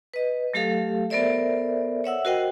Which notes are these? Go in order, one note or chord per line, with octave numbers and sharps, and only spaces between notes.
B4 D#5
F#3 A3 G4 A4 F5
B3 A4 A#4 C5 D5 E5
C#5 E5 F#5 E6
F#4 A#4 C5 D#5 F#5 G5